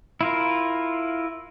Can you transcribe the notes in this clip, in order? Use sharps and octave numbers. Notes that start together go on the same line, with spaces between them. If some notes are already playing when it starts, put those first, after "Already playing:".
E4 F4 A#4